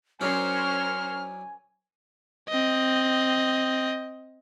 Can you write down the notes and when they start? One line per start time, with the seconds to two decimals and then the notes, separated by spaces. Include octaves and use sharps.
0.21 F#3 C#4 D4 E4 A#4 C5 G#5 F6
2.48 C4 D#5